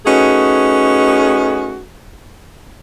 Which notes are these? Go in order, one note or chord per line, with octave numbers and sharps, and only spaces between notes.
A3 C#4 D#4 F#4 G#4 B4